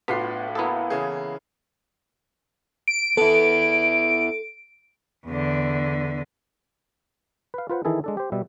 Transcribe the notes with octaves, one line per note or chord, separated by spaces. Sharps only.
A2 B3 D4 F4 F#4 C6 B6 C7
A#3 B3 E4 A4 D#6
C#3 E3 G#4
D7
B3 E4 A4
E2 D3
B4 F5
F4 B4 C5 F#5
D#3 E3 E4 G#4 A4
G#3 D4 A4
G4 C5
B2 G3 E5